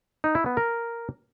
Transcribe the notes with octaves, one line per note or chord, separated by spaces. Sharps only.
D#4
E4
B3
A#4